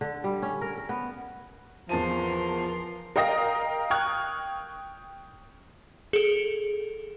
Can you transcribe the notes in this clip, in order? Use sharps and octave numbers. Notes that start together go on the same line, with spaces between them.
D3
G3
C#4
A#4
A#4
B3
E2 F3 A#4 A5 C6 D#7
A#4 D#5 F5 G5 D#6 A#6
G5 C#6 D#6 F6 F#6 G#6
G#4 A4